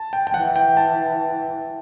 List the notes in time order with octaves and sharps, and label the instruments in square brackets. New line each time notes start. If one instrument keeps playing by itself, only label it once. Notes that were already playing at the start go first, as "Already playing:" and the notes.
Already playing: [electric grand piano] A5
G5
G5
[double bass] E3 [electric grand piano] F#5
[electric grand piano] G5
A5